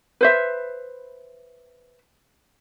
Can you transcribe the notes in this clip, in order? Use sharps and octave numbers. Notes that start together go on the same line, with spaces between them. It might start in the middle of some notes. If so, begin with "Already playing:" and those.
B4 C5 E5